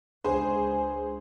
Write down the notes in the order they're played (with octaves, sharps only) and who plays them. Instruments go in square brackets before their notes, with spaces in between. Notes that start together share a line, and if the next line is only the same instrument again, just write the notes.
[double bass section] C#2 [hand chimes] D4 G#5 [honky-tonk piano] G#4 C5